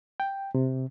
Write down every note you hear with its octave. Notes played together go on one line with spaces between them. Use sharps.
G5
C3